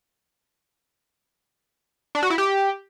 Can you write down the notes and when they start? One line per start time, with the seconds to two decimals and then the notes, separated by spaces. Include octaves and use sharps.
2.15 D4
2.23 F#4
2.30 E4
2.38 G4